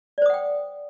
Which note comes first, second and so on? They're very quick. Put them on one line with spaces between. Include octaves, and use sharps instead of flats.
D5 C5 D#6 F#5 G5